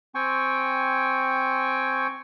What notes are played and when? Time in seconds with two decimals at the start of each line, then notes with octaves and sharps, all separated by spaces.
0.15 C4 G5 G#5 C#6